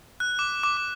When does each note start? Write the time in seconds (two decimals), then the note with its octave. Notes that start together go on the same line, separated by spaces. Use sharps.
0.20 F#6
0.39 D6
0.63 D6
0.77 D6